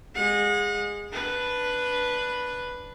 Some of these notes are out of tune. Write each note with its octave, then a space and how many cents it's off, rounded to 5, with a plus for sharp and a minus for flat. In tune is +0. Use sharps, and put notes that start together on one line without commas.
G#3 -15 F#5 -35
D4 +0 B4 +0